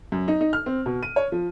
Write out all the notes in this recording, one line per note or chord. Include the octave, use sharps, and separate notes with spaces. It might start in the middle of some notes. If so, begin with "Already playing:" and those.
F#2
D#4
D#4
F6
C4
B2
D#7
C#5
F3